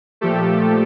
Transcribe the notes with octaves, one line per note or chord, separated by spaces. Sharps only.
A#2 F3 A3 G4 A4